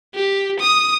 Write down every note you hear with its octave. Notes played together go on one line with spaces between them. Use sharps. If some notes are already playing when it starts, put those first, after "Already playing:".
G4
D#6